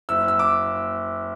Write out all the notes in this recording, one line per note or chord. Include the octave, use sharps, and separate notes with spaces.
F#1 E6
E6
D6